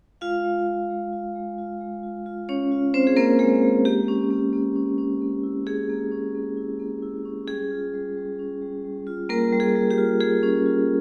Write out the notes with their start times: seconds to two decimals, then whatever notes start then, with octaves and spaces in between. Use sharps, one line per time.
0.21 G#3 F4 F5
0.44 G#3
0.67 F4
0.90 G#3
1.13 F4
1.35 G#3
1.58 F4
1.80 G#3
2.03 F4
2.26 F4
2.49 C#4 C#5
2.72 F4
2.94 C4 F4 C5
3.07 G#4
3.17 A#3 C#4 A#4
3.39 G#3 G#4
3.63 G#3
3.85 A#3 G4
4.08 C#4
4.31 A#3
4.53 A#3
4.76 C#4
4.98 C#4
5.22 A#3
5.43 E4
5.67 C#4 G#4
5.89 A#3
6.12 C#4
6.35 A#3
6.57 E4
6.79 A#3
7.02 E4
7.25 C#4
7.48 G3 G#4
7.71 F4
7.94 G3
8.17 G3
8.39 C#4
8.62 G3
8.84 G3
9.07 F4
9.29 G3 A#3 A#4
9.52 G3
9.60 G#4
9.75 G3
9.91 G4
9.98 F4
10.20 G3 G#4
10.43 C#4
10.66 F4